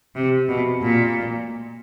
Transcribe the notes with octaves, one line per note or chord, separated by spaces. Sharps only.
C3
B2
A#2